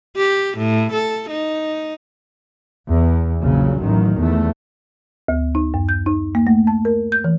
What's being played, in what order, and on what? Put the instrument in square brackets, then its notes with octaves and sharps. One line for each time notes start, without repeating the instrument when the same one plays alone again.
[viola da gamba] G4
A2
A4
D#4
[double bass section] E2
A#1 C#3 F#3
A1 D#3 F#3
E2 A3
[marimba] D2
D#4
F#2
G6
D#4
A#3
A3
A5
A#4
G6
E3